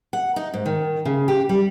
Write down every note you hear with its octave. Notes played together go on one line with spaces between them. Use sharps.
F#5
D#4
G#2
D#3
C#3
G4
G3